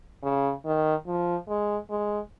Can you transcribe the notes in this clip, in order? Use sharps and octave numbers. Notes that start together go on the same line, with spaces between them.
C#3
D#3
F3
G#3
G#3